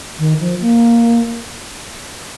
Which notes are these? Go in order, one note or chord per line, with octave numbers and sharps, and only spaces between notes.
D#3
F3
A#3